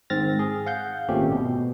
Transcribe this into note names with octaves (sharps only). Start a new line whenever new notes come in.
G#2 D#3 C4 F6 A6 A#6
G#4
F5 F#5 G6
G#1 A#2 A3 C4 C#4 G4
B2